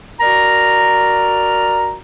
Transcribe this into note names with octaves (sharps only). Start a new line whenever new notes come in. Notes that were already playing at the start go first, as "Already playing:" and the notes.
F#4 A#4 D5 A#5